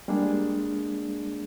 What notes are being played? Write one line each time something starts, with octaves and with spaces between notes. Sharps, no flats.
G3 G#3 A#3 D4 G#4